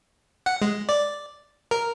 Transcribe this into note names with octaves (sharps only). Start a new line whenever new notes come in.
F#5
G#3
D5
A#4